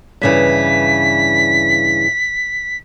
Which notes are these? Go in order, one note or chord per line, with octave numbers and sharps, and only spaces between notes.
G2 C#3 E3 B6